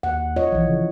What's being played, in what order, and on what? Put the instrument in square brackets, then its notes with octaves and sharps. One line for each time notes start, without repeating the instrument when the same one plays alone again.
[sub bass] D#2 [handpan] F#5
[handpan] F4 C#5 D#5
[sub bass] B1 [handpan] E3 F3
[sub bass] C#3